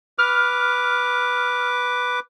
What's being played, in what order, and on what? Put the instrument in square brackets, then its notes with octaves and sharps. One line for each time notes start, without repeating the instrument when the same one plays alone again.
[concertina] B4 D6 [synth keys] F6